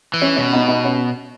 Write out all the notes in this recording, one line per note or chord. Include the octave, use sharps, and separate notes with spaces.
E3
C#4
B2 C#4
B3 D#4
B3 D#4
C#4